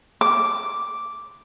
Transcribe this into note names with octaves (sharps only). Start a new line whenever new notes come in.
D6